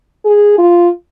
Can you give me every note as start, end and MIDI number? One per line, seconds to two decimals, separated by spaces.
0.25 0.57 68
0.58 0.89 65